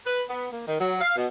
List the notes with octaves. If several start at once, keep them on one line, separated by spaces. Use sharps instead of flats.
B4
B3
A#3
D#3
F#3
F5
B2